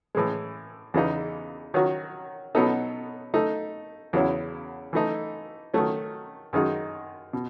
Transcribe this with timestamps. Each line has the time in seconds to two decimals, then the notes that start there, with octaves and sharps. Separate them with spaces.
0.15 A2 E3 G#3
0.94 E2 C#3 E3 B3 D#4
1.74 D#3 F#3 C#4 F#4
2.55 B2 F#3 B3 D#4 A4
3.34 A3 D#4 A4
4.13 E2 C#3 F#3 C#4 E4
4.93 E3 A3 D#4
5.74 D#3 F#3 A3 C#4
6.53 F#2 D#3 G#3 D#4 F#4
7.33 B2